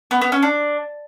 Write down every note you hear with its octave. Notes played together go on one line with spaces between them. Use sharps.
B3
B3
C#4
D4